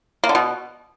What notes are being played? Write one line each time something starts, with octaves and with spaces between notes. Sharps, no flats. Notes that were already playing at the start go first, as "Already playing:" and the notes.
A#3
D3
B2